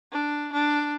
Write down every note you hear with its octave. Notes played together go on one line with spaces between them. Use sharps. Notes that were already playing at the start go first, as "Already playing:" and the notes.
D4
D4